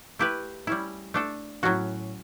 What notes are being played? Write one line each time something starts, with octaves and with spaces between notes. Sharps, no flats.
A3 E4 G4 B4
G3 C#4 E4
A3 D4 A4
A2 F#3 C#4 F#4